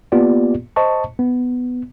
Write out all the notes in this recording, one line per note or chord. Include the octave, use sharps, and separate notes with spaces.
A#3 B3 F4 G4 D5
C5 D#5 A5 C#6
B3